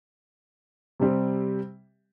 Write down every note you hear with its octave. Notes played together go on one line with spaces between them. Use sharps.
C3 G3 C4 G4